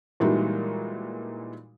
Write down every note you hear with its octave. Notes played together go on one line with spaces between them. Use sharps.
A#2 E3 G3 G#3 D#4 F#4